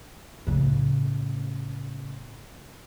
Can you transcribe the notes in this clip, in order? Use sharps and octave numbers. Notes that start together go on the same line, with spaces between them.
A2 C#3